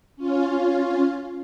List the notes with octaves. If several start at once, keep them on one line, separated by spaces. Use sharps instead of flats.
C#4 F4